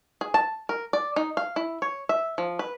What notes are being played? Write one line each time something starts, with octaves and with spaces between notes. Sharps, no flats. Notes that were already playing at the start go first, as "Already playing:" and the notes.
G#4
A5
A#4
D5
D#4
F5
E4
C#5
E5
F3
B4